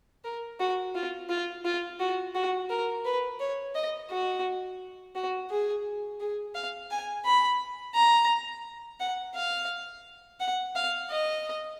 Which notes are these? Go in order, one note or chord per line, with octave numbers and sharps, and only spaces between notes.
A#4
F#4
F4
F4
F4
F#4
F#4
A#4
B4
C#5
D#5
F#4
F#4
G#4
G#4
F5
G#5
B5
A#5
F#5
F5
F#5
F5
D#5